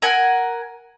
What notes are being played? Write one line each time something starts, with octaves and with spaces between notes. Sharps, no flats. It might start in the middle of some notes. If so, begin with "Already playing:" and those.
A#4 F#5 G#5